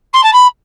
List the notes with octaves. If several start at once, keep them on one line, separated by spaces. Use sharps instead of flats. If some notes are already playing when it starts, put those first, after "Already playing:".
C6
A5
B5